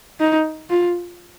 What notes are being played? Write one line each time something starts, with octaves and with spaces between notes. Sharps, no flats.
D#4
F4